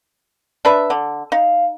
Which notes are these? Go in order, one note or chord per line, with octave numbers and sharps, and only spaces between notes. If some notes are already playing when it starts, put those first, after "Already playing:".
D4 B4 E5
D3
D#4 F5